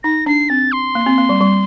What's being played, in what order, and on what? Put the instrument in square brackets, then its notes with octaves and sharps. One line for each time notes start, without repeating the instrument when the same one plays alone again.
[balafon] D#4 [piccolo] A#6
[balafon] D4 [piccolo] C7
[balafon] C4 [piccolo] A6
[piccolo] C6
[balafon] A#3
C4
A#3
G3
G3